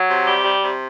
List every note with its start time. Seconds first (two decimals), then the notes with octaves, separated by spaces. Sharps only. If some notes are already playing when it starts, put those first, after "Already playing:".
Already playing: F#3
0.09 C3
0.27 G3 G4
0.45 G3
0.62 C3